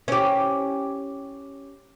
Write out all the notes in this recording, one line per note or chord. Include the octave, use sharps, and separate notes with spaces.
C#4 G4